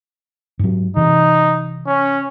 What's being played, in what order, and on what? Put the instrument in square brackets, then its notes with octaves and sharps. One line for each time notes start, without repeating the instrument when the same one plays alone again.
[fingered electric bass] G#2 F#3
[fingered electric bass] C3 E3 [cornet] D#4
[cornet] C#4